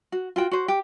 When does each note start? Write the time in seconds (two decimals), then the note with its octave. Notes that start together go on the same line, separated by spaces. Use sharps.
0.12 F#4
0.36 F4 F#4 G5
0.51 F#4 C5
0.68 G4